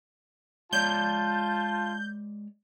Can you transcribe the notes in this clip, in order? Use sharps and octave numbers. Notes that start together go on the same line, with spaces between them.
G#3 F4 C#5 D5 A5 G6